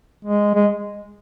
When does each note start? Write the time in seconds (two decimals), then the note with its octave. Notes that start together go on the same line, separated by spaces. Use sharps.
0.25 G#3
0.55 G#3